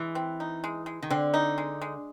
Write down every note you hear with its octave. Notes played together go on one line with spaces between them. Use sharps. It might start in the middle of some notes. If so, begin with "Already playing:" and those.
Already playing: E3 G#3
C4
D#4
G#3
G#3
D#3
D3 C4
D#4
G#3
G#3